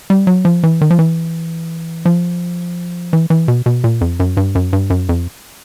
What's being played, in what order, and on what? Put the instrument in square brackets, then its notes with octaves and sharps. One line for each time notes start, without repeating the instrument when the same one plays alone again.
[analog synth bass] G3
F#3
F3
E3
D#3
F3
E3
F3
E3
E3
B2
B2
A#2
F2
F#2
G2
F#2
G2
F#2
F2